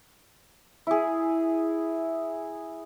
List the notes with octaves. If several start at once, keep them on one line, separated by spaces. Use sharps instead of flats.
E4 G#4